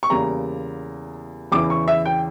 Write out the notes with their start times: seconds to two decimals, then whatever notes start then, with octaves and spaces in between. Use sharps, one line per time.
0.03 C#6
0.10 E2 C#3 G3 A#3 A#5
1.52 E2 C#3 E3 D6
1.70 C#6
1.88 E5
2.05 G5